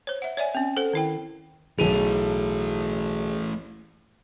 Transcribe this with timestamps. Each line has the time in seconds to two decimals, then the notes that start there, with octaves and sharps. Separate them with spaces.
0.07 C5 C#5
0.22 E5 F#5
0.37 C#5 D5 E5 G#5
0.55 C4 C#4
0.77 A4 C5 F#5
0.93 D#3 E4 G5
1.79 B1 E3 A3 G#4 D#7 F7